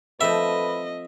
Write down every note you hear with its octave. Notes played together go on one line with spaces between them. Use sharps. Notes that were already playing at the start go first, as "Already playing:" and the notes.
F3 A3 C4 B4 D#5 E5